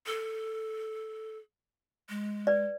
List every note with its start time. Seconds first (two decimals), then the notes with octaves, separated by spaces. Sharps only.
0.06 A4
2.09 G#3
2.47 B4 D5